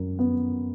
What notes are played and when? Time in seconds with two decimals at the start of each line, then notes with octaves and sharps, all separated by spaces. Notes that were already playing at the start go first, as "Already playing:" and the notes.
Already playing: F#2
0.19 B3